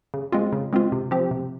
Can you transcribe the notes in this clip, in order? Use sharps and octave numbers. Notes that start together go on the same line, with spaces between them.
C#3
G#3 C4 F4
C#3
G#3 C4 F4
C3
F3 C4 G4
C3